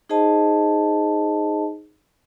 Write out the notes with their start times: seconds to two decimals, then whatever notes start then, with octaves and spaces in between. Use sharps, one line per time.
0.09 D#4 G#4 C5 D#5 A5